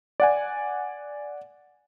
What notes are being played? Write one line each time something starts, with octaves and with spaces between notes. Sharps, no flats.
D5 F#5 G#5